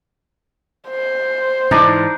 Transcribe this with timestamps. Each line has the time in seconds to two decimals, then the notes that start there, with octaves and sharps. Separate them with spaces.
0.89 C5
1.71 G#2 E3 D4 D#4